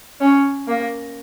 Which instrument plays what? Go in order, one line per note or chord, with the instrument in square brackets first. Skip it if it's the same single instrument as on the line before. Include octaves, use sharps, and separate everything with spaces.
[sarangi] C#4
A#3